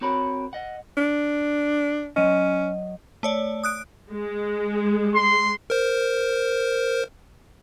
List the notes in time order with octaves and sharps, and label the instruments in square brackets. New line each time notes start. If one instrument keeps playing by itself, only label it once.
[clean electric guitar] C4 F#4 A#4 C#5 B5
D#5 F#5
[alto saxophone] D4
[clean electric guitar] F#3 D#5 [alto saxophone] C#4
[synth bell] A3 C#5 D5
D#6 F#6 D7
[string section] G#3
[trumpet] C6
[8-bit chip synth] A#4 C5